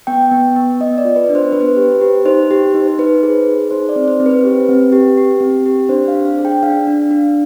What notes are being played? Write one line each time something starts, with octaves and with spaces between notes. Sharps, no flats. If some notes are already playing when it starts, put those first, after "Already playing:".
B3 G5
B3
B3
B3 D#5
D5
F4
B4
D4
C5
B3 B4
C5
B4
G4
G4
D#4 C5
G4
D#4
C5
D#4 B4
G#4
G#4
D#4 C5
D5
C4
C5
C4
B4
G4
C4
G4
G4
C4
G4
D4 C5
F5
D4
F5
G#4
G5
D4 F5
D4
D4